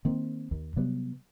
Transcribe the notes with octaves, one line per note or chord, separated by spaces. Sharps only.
D#3 A#3 C4
D#2
C3 F#3 G3 B3